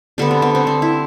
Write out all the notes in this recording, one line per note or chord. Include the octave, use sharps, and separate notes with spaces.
D3 G3 B3 D4
C4
B3
C4
D4
E4